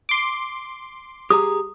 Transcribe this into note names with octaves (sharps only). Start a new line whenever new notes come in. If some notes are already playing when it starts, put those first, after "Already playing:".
C6 D6
G4 G#4 A#5 D#6